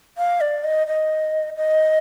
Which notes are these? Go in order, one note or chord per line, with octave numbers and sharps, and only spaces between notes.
F5
D5
D#5
D#5
D#5